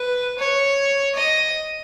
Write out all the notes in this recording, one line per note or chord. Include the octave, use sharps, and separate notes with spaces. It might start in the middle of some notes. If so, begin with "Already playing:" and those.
Already playing: B4
C#5
D#5